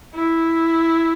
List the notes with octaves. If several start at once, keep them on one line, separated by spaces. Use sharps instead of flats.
E4